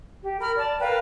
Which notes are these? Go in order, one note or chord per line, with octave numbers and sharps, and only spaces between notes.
G4
A#4 B5 F6
D5 A5
A#4 B4 F5 G5